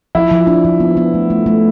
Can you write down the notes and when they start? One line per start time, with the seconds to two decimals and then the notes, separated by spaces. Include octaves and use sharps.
0.15 F3 E4
0.32 F3
0.47 D4
0.65 F3
0.80 B3
0.97 B3
1.14 A3
1.30 A3
1.46 A3